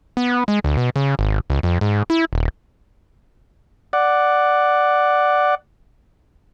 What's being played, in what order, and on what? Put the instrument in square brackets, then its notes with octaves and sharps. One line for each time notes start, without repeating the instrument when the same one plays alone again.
[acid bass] B3
G#3
D2
B2
C#3
G#1
C#2
F2
G#2
E4
D#1
[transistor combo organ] D5 F#5